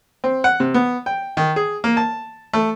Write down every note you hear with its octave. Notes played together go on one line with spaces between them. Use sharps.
C4
F#5
C3
B3
G5
D#3
G#4
A#3
A5
A3